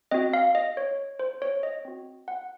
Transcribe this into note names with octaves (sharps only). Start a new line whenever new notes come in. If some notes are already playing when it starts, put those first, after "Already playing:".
C4 F#4 D#5
F5
D#5
C#5
C5
C#5
D#5
C4 F#4
F#5